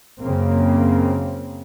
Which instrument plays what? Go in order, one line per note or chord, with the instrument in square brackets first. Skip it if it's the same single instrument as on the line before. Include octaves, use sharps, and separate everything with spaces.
[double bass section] F#2 C#3 A#3 C4